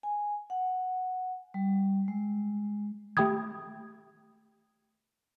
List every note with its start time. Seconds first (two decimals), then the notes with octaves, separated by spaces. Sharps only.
0.03 G#5
0.50 F#5
1.54 G3
2.08 G#3
3.17 A3 G4 G5 B5 D#6 G#6